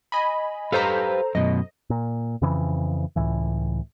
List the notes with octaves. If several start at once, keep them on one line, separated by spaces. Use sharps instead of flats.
D#5 G#5 B5
G4 A4 B4 C5 F5 A#5
F#2 B2 D#5
A#2
F2 C#3 E3
C#2 A2 E3